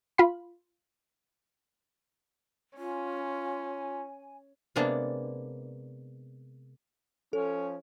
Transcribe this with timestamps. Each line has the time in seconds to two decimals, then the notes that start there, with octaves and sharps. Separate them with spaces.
0.18 F4 F5 B5
2.78 C#4 F4 G#5
4.76 C3 G#3 A#3 B3 D4
7.33 F3 C#4 A4